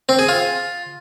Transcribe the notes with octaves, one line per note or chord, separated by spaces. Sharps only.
C4
G#4
F4